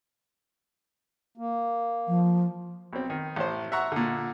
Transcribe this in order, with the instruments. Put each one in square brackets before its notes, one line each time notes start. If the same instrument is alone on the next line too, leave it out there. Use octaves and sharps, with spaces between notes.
[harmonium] A#3
[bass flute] F3
[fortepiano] B1 C4
D#3
A1 C5
E5 F#5 A#5 C#6
A#2 D3